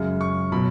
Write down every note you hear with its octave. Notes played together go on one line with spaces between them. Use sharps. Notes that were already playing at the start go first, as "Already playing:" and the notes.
Already playing: F#2 C#3 G#3
C#6
B2 F#3 B5